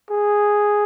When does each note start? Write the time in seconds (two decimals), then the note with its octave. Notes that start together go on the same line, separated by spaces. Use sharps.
0.11 G#4